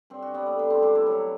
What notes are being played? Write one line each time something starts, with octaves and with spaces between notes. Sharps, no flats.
G2 C4
F#4
G3 B3
A3
D3 B3
C4
G2 D4
E4
F#3